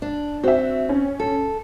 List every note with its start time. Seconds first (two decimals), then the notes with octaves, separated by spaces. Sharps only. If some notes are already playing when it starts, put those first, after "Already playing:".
0.02 D4
0.43 C4 F#4 E5
0.89 C#4
1.20 A4